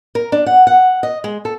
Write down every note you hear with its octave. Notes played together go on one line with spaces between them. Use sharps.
A#4
D4
F#5
F#5
D#5
G#3
A4